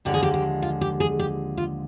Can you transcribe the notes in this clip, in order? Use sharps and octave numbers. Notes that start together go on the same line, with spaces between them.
D#2 D3 F3 G#3 G4
G#4
G4
G4
F4
G4
G#4
G4
F4